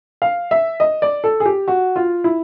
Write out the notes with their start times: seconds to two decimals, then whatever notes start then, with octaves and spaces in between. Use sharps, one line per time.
0.22 F5
0.51 E5
0.80 D#5
1.02 D5
1.24 A4
1.40 G#4
1.45 G4
1.68 F#4
1.96 F4
2.24 E4